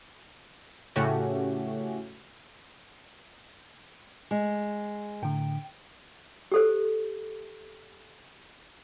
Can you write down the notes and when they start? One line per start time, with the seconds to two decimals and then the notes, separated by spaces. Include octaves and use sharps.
0.96 A2 C#3 A3 C#4 F#4 G4
4.31 G#3
5.22 A2 D3 G5
6.52 G4 A4 C5